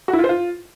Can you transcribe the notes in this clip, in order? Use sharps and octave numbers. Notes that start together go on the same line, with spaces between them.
F#4
E4
F4
C5
F4